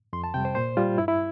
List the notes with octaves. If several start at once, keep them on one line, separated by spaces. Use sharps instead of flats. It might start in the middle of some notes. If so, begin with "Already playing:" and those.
F2 C6
A5
C3 G3 G5
C5
A#2 C5
G3 F4
G2 E4
E4